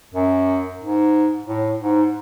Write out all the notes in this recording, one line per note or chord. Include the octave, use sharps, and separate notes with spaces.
F#2
G#2
A2
G#2